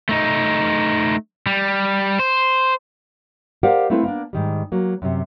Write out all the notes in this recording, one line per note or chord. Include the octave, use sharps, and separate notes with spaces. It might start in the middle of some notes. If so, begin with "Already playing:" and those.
A3 D#4
G3
C5
G4 A#4 C5 D5 F5 F#5
A3 A#3 C4 E4 A4 B4
A#3 B3 D4
G#2 D#3 G3
F#3 A#3
F#2 C3